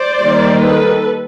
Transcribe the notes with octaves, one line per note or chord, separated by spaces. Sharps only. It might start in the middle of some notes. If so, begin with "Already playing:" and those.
Already playing: C5 D5
D#3 G3 A#3
A4 B4